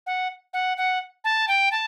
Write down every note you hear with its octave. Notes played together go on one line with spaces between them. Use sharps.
F#5
F#5
F#5
A5
G5
A5